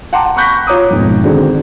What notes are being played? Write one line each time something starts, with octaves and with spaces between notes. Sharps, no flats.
F#5 G5 A5 A#5 C6 D6
B5 C#6 F#6 G6 A#6 B6
F4 C#5 A#5 D6 D#6
F2 G#2 B2
D3 D#3 C4 D4 F#4 G#4